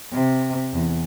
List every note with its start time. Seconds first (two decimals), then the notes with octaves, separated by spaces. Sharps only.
0.13 C3
0.73 E2